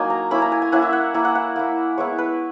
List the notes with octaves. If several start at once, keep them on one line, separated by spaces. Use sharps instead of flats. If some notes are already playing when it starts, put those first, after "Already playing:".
Already playing: F#3 A#3 D#4 G#5
A#5
A#3 C#4 E4 B5
A#5
G#5
G#5
A#3 C#4 E4 F#5
E5
F#5
A#3 E4 A#5
F#5
F#5
A#3 E4
G#3 B3 E4 C#5
B4